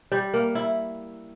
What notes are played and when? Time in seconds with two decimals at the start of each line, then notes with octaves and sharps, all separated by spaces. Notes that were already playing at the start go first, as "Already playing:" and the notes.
0.12 G3
0.34 A#3
0.55 E4